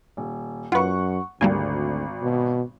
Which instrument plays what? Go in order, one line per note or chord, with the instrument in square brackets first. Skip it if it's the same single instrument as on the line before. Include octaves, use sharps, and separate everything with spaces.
[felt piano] D#1
[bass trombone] F#2 [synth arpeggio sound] F4 B4 [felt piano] F#5 C#6
[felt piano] G#1 [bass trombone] D2 [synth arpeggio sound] G3 A#3 G#5
[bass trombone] B2